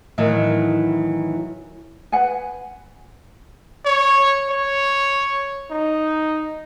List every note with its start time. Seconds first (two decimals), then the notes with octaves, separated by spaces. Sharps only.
0.18 A2 D#3 E3 F#3 D#4
2.12 B4 F#5 G#5
3.86 C#5
4.50 C#5
5.71 D#4